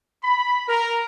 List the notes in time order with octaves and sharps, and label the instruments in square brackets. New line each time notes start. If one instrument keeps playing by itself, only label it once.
[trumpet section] B5
A#4